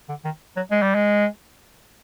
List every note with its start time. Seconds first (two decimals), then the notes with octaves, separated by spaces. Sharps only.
0.09 D3
0.25 D#3
0.56 F#3
0.71 G#3
0.82 G3
0.95 G#3